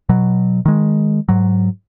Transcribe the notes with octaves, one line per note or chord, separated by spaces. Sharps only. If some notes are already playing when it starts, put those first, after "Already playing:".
B2 F#3
D#3 G#3
G#2 F#3